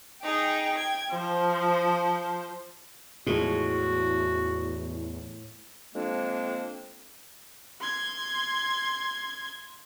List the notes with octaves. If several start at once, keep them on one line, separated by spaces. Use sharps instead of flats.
D#4 G#4 G5
G#6
F3 C5
E2 A2 F3 G#3 F#4
F2 G#3 A#3 C4 D4
C6 G#6